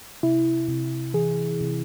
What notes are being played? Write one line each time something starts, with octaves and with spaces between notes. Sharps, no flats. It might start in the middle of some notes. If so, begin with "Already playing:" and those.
C3 E4
C3
E3 G#4
C3